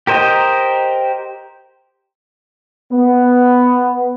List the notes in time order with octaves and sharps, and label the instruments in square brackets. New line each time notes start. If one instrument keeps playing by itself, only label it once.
[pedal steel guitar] G4 A#4 C5 D#5
[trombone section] B3